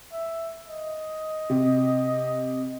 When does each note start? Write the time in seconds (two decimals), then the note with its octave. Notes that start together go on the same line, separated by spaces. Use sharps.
0.12 E5
0.69 D#5
1.50 C3